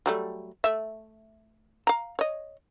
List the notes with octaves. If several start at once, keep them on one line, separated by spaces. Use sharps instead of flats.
F#3 G3 A3
A3 E5
F5 A#5
C#5 D#5